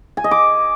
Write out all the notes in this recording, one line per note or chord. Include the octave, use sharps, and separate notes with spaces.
G#5
D#5
D6